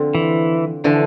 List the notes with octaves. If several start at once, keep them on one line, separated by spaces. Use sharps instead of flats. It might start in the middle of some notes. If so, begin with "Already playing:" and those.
Already playing: D3 F3 C4 F4
E3
D3 E3 F3